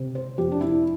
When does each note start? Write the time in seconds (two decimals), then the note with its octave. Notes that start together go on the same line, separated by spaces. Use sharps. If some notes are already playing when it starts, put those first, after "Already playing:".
Already playing: C3
0.15 C5
0.38 F2 G4
0.52 D4
0.61 E4